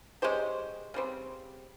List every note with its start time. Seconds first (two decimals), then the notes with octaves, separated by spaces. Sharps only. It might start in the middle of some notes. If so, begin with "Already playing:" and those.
0.22 G#3 C#4 G4 C5
0.94 C#3 G3 C4